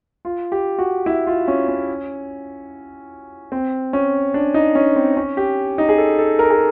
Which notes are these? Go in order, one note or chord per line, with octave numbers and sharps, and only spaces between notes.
F4
G4
F#4
E4
F4
C#4
C#4
C4
C#4
D4
D#4
C#4
C4
C#4
G4
D#4
G#4
A4
A4
A#4
G#4